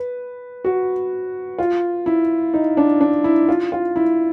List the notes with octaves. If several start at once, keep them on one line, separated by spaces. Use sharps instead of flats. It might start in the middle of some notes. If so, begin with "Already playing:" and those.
Already playing: B4
F#4
F4
E4
D#4
D4
D4
E4
F4
F4
E4